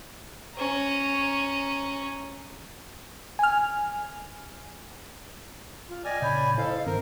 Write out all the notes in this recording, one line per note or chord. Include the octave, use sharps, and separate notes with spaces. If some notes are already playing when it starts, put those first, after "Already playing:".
C#4 A#5
G#5 F6
F4
D5 D#5 G5 G#5 F6 G#6
A#2 C#3 C#5 B5 G6
E4 A4 C5 D#5 F5
G2 D#3 C4 A#4 C5